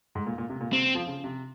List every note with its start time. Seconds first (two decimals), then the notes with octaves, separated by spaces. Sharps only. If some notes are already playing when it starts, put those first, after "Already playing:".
0.15 G#2
0.26 A#2
0.38 A#2
0.50 C3
0.61 A#2
0.72 C3 C4
0.95 F3
1.07 C#3
1.24 C3